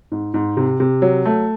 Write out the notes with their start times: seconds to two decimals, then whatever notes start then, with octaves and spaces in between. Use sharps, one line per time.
0.12 G#2
0.34 G#2
0.57 C3
0.80 C3
1.02 F#3
1.25 A3